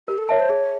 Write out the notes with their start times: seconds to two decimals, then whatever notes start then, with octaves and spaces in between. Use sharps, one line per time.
0.08 G4 A#4
0.18 A4
0.29 A#4 C#5 E5 A5
0.39 C5
0.49 G#4 C#5